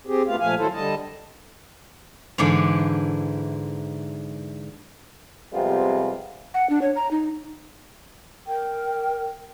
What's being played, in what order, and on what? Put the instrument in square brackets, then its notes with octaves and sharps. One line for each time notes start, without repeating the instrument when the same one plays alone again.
[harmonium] C4 G4 G#4
F#2 A3 B3 F4 F5
A#2 F3 A3 F5 G#5
D#3 F#3 E4 A4 C5
D3 G3 D#5 A5
[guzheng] G#2 D3 E3 D4 E4
[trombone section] F2 C3 G3 G#3 B3 F4
[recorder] F#5
D4
C#5
A#5
D#4
[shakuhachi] A#4 [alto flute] G5